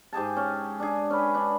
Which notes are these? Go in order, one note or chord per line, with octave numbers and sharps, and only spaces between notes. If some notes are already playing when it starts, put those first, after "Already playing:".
G#2 G4 G#4 A5
C#4
D4 G#4
C#4 B4
D4